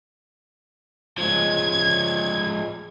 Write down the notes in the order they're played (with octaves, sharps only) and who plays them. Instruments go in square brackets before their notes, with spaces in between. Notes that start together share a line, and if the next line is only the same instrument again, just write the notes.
[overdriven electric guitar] F3 G#3 [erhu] G#6